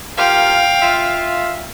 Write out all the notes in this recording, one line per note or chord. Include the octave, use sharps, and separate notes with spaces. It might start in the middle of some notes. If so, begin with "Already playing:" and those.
A#3 F4 G4 F5 G5
F4 E5